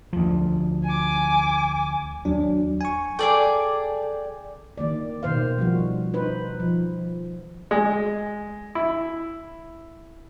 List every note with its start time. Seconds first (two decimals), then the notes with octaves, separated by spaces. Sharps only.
0.13 D2 F3
0.85 G#5 D6
2.25 D#2 F#3 D4
2.81 G#5 C#6
3.19 G#4 A4 D5 G5 D6
4.78 D#3 A#3 D5
5.23 B2 D#3 C5 F5
5.58 F3 G3 F#4
6.14 D#4 B4 C5
6.60 F3
7.71 G#3
8.75 E4